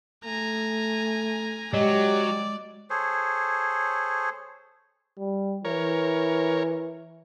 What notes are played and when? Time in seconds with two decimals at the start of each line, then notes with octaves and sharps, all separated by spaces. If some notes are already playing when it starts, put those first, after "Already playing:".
0.25 A3 G#5 A#5
1.74 F#3 G#3 G4 D5 D#5
2.90 G#4 A4 C5 C#5
5.18 G3
5.65 E3 A#4 C#5